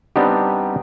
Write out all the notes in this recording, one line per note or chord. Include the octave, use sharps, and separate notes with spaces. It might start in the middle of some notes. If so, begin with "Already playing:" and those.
G3 B3 C4 D4 D#4 G4